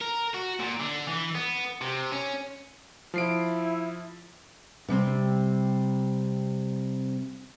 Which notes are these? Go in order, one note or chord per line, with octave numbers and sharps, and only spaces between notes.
A#4
F#4
A#2
D3
E3
B3
C3
C#4
F3 E4 C7 D7
C3 G3 C4